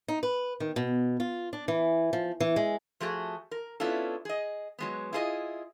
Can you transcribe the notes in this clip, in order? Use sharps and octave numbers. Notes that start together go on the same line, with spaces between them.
D#4
B4
D#3
B2
F4
D4
E3
F3
E3
G#3
F3 A3 F#4 G#4
A#4
B3 C#4 D4 E4 F4 A4
G#4 D#5
F#3 G#3 B3
E4 F4 G#4 C5 D#5